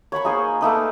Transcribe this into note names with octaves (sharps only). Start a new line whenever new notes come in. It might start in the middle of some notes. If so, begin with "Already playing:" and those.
C#5 F#5 B5 C#6
A#3 D#4 G#4 C5
A3 A#3 D#4 B4